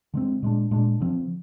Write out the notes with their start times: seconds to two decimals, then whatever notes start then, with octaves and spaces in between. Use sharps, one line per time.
0.14 D3 G#3 C4
0.42 A#2 G#3 D4
0.71 A#2 G#3 D4
1.00 D3 F3 C4